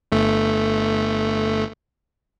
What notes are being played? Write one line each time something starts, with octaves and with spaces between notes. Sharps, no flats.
G1 A3